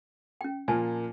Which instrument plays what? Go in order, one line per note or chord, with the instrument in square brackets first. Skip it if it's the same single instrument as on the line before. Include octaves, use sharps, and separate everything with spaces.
[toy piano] C#4 G5
[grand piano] A#2 F3 A#3 [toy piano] G#5 A5